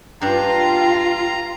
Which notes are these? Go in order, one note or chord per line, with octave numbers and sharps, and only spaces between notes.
G2 D4 F4 G5 A#5